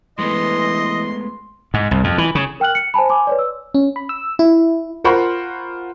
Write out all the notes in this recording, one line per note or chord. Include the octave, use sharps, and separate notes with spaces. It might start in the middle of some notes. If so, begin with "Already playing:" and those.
E3 G#3 A3 B3 D#5 C6
G#2
C2
F2
E3
C#3
A#4 G5 F6 F#6 F#7
C#7
C5 G#5 A5 B5
G#5 C6 D6
B4 C#5 D5
E6
C#4
B5
E6
E4
F4 A#4 C5 F#5 B5 C#6